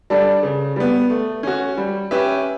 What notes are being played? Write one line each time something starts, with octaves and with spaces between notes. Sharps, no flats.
G3 D4 A4 D5
C#3
G3 B3
A3
C#4 F#4
G3
C#4 G4 B4 E5